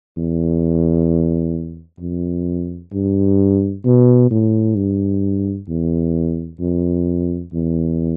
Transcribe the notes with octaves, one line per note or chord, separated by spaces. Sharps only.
E2
F2
G2
B2
A2
G2
E2
F2
E2